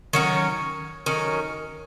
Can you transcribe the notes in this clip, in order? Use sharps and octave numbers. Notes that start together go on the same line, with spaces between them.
D#3 F#3 C#4 C#5
D#3 F#3 C#4